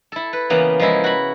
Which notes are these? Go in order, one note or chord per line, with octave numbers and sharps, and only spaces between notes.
E4 A4
B4
C#3 E3 A#3 B3
F3 G#3 E4
F#4 B5